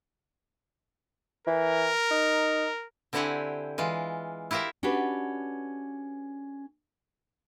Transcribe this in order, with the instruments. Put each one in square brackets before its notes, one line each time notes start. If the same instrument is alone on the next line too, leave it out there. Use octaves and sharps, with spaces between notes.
[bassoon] E3 [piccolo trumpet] A#4
[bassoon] D#4
[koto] D3 C4 E4 G4 F#5 G#5
E3 G#3 F4
E4 F4 G4 A#4 E5
[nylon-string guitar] C#4 D4 F#4 G4 A4 B4